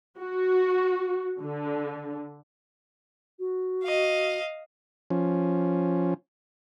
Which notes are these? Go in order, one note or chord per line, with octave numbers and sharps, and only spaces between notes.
F#4
D3
F#4
D#5 F5
F3 C#4